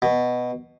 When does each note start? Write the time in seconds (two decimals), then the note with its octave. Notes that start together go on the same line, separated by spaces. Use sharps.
0.02 B2